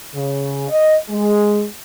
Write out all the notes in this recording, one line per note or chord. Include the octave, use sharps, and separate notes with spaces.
C#3
D#5
G#3